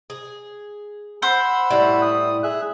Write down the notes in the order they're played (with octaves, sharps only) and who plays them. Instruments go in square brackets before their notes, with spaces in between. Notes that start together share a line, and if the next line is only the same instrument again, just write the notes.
[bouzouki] G#4
[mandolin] C5 [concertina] F#5 B5 E6
[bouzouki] A2 G3 E4
[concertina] D#6
G#4 E5 F#6